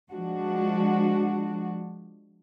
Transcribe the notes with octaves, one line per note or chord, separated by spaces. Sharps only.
F3 G#3 D4 F#4